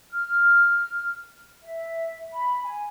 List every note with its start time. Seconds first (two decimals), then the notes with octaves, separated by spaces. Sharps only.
0.12 F6
1.63 E5
2.33 B5
2.64 G#5